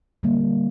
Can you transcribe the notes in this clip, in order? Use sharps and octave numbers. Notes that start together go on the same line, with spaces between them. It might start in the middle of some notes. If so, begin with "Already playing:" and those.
D3 G3 A#3